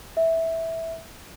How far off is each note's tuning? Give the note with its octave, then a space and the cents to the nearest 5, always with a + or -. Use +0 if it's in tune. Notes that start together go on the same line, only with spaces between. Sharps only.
E5 -10